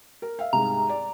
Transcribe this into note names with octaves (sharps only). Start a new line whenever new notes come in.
A#4
E5 F5
C2 G#2 A#5
D5